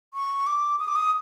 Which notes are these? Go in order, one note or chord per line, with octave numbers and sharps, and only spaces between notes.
C#6
D6
D#6
D6
D#6